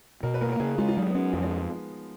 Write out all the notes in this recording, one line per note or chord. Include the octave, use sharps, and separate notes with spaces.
B2 A#4
B4
A#3 A#4
A#4
C#3 G#4
G#3 F4
F4
F#3 D#4
B3
G#3 C#4
F2 F3
G#3